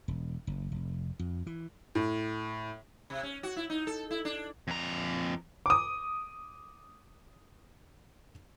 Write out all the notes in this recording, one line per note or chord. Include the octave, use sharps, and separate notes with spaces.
E1
F#1
F1
F2
E3
A2
C3
C#4
F#4
E4
D#4
A4
E4
D4
F2 A#5
D6 D#6